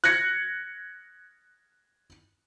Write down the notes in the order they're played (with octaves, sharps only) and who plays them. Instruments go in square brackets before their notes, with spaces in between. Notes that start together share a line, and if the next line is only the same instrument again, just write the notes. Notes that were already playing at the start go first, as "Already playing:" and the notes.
[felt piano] F#6 G#6 A#6 C#7